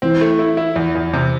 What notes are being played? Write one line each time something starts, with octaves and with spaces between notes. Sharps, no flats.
E3 C4
A3
E4
E4
E2
E2
C3